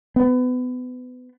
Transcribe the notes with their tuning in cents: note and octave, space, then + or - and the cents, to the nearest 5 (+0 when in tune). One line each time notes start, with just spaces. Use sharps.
B3 +30